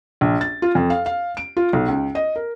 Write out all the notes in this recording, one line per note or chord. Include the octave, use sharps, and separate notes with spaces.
A#1
A6
F4
F2
F5
F5
D7
F4
B1
C#2
D#5
A#4